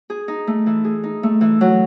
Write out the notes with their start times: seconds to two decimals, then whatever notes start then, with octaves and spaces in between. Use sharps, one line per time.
0.10 G#4
0.28 D#4
0.47 A3
0.66 E3
0.85 G#4
1.04 D#4
1.23 A3
1.41 E3
1.61 F#3